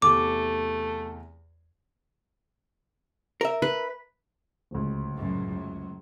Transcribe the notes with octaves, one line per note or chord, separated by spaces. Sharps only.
E2 C3 A3 D6
A#4 E5
B4
D1 C#2
F#2 A2
F#3